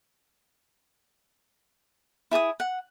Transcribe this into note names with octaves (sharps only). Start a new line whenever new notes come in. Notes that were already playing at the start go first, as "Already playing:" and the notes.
E4 G#4 A5 D#6
F#5